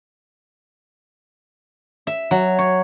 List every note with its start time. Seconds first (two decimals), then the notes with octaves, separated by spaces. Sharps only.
2.07 E5
2.31 F#3
2.58 C#5